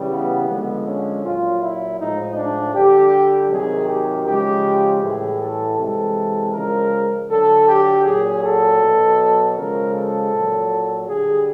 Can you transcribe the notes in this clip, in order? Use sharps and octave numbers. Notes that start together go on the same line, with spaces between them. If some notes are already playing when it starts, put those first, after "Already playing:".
Already playing: C#3 E3 G3
B3
D3 F3 G#3 B3
C#4
A#2 F#3 F4
E4
A2 F3 G#3 D#4
D4
D3 G3 G4
C3 D#3 F#3 G#4
G4
C#3 F3 G#3 G4
A2 E3 G3 G#4
A4
C3 E3 G#3 A4
C#3 F3 G#3 A#4
D3 F#3 A4
G4
A#2 F#3 G#4
A4
B2 F#3
C#3 F3 G#3 A#4
A4
A#2 F#3
D3 G3 G#4